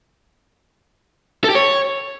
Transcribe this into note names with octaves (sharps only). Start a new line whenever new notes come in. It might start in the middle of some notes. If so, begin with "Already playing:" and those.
A4
G4
C#5